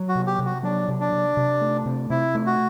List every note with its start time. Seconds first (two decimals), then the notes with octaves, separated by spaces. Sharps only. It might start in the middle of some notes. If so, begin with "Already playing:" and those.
Already playing: F#3
0.09 F#4
0.15 C3
0.27 G4
0.39 C3
0.46 F#4
0.63 F#3 D4
0.88 C3
1.00 D4
1.13 C3
1.37 C3
1.61 A3
1.86 C3
2.10 C3 E4
2.35 A3
2.46 F#4